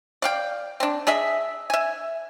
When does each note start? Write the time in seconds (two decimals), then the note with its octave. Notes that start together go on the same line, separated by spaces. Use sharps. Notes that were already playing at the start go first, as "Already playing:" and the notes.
0.22 D5 F5 G5
0.80 C4 D4
1.07 D4 G#4 D#5 E5
1.70 E5 G#5